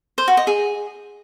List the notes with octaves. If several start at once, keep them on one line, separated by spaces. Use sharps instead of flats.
C5
F#4
D#5
G#4